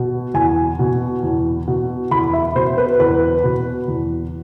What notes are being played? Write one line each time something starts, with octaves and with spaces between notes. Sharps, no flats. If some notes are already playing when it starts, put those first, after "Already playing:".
Already playing: B2
E2 G#5
B2
E2
B2
E2 B5
E5
B2 C5
B4
E2 B4
B2
E2